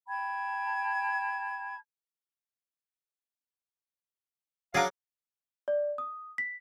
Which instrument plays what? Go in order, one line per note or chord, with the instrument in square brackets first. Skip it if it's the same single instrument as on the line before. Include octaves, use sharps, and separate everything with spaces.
[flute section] G5 A5 B5 G#6
[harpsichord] F#3 D4 [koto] G#4 A#4 [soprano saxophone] F5
[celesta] D5
D#6
B6